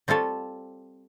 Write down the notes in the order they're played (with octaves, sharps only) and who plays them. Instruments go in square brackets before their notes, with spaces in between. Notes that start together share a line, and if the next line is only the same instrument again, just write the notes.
[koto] G3 C4 F4 A4 C#5